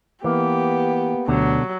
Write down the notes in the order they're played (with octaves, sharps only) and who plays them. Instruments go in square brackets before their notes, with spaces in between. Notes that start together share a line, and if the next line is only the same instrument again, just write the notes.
[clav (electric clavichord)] E3 [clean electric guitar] A#3 [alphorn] B3 [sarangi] G4
[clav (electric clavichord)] D2 [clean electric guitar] B2 D3 [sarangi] F#3